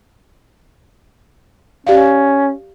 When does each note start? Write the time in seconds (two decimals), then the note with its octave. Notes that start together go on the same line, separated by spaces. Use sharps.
1.87 C#4 G4 D5 F5